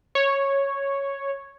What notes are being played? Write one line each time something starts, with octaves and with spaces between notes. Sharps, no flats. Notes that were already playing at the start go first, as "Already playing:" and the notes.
C#5